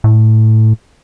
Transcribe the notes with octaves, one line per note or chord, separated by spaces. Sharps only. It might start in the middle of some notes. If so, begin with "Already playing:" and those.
A2